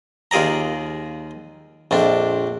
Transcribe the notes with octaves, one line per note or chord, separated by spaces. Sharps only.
D#2 F4 G#4 D5 A#5
A#1 F2 D4